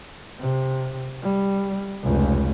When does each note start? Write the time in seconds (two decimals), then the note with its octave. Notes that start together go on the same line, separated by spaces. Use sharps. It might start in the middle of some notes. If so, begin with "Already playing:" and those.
0.40 C3
1.23 G3
2.03 F1 C#2